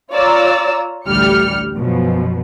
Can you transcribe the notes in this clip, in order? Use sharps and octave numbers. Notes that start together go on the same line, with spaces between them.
F4 C#5 D5 A#5 E6
A1 D2 G3 G5 F6 C#7
F#2 B2 F3